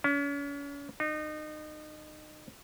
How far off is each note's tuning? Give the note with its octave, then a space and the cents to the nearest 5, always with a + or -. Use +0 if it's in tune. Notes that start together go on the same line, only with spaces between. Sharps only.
C#4 +40
D#4 -30